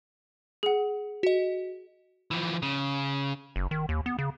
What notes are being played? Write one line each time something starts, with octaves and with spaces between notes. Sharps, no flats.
G#4 F#5
F#4 D#5
E3 F3
C#3
F#1
D#3
D#2
B3
C#3